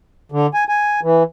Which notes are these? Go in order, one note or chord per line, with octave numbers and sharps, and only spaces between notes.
D3
G#5
G#5
E3